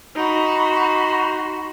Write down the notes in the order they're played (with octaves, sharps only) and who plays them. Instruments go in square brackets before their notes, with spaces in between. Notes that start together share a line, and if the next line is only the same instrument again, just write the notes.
[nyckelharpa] D#4 [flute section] F#4 B5 C6